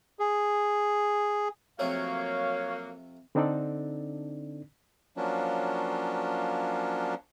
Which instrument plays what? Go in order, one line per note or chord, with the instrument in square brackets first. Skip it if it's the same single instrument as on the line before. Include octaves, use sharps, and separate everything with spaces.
[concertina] G#4
[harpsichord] F2 C3 A3 [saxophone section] F#3 A#3 [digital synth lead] C#5 [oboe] F5
[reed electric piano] D3 C4 D4 D#4 A4 D5
[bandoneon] F3 F#3 A#3 C#4 D4